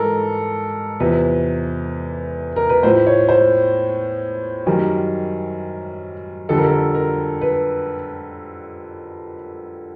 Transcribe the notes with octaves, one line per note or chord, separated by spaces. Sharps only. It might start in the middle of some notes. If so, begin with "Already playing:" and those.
Already playing: G#2 E3 G3 A4 A#4
E2 C3 F3 B4
A#4
B4
A2 F3 C5
C#5
C5
F#2 D#3 G3 A#4
F2 D3 G3 A4
A#4
A4
A#4
B4